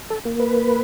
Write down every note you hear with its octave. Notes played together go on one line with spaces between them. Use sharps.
A4
A#3
B4